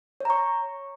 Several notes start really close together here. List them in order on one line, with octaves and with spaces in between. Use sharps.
C#5 A#5 C#6